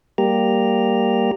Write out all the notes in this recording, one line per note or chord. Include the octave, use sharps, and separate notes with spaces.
G3 A#3 G4 A#5